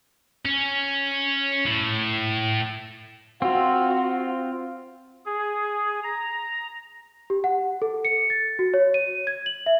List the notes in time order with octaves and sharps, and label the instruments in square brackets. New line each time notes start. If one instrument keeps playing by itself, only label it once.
[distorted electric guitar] C#4
A2
[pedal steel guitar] C4 F4 [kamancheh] F#4
[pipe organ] G#4
A#5
[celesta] G4
F#5
A4
C#7
A6
F#4
C#5
D#7
G#6
F#7
E5